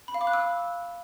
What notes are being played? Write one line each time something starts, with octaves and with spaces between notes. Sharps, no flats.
B5
F5
D6
F#6
E6